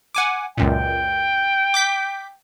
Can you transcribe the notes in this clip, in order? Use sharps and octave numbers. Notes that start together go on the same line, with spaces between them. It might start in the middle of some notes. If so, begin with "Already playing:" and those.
F#5 G#5 D6
C#2 F#2 A#2 G5
D6 G6 B6